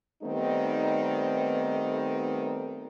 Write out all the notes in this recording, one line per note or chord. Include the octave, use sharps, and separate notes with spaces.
D#3 G3 A3 B3 C4 D#4